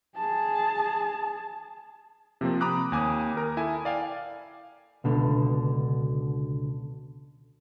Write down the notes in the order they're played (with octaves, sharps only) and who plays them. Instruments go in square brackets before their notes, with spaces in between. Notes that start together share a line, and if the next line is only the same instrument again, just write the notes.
[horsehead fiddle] G#4 A5
[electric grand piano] C3 F3 A#3 C4
A#5 B5 D6 D#6 F#6
D#2 G#5 D6 D#6
A#4 A#5
E4 A4 G#5
D5 F5 G5 G#5
[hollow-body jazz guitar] C#2 B2 D3